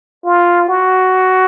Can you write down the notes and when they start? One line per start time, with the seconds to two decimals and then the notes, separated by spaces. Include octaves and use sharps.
0.25 F4
0.68 F#4